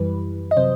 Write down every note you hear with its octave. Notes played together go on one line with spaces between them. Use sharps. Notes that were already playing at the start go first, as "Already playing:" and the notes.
Already playing: F#2 E3 G3 B4
D#5
C3 F#3 C5